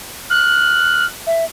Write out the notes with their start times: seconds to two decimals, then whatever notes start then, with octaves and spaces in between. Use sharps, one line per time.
0.30 F6 F#6
1.27 E5